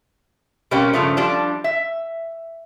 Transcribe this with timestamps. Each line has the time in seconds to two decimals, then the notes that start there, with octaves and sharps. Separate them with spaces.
0.71 B2 G3 A#3 C4 C#4 G4
0.93 G2 C#3 F3 A3
1.17 F3 G3 D4
1.64 E5